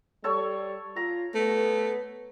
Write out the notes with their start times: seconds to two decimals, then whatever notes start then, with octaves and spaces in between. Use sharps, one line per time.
0.24 G3 A4 C#5 C#6
0.96 F4 A#5
1.35 A3 B3